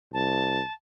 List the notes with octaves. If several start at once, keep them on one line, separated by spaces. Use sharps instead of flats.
C2 A5